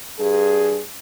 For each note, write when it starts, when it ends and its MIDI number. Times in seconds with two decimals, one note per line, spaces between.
0.19 0.80 43
0.19 0.80 68